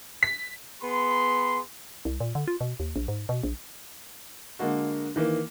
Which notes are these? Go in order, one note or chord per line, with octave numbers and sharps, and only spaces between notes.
B6
B3 G#4 B5 C6
C2
A#2
D3
F4
B2
D#2
A#1
G#2
B2
A#1
D3 G#3 A#3 F#4
D#3 E3 A#3